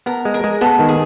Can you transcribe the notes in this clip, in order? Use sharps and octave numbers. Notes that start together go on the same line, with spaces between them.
B3 A#4
G#3
A#4
G#3
B3 A4
D#3
G#4